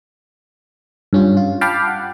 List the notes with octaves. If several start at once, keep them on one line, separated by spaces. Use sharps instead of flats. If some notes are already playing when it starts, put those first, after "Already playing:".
G2 C#4 F4
F4
F5 G5 A5 B5 D6 F6
F#5